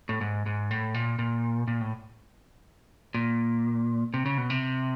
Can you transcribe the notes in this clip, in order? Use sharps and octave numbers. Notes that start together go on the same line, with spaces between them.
A2
G#2
G#2
A2
A#2
A#2
A#2
A2
A#2
C3
C#3
B2
C3